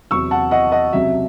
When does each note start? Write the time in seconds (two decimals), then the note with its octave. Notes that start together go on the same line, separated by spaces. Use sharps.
0.11 E2 C3 F#3 C#6 E6
0.31 F#5 A5
0.51 D#5 F#5
0.72 D#5 F#5
0.93 C#2 C3 F#3 E5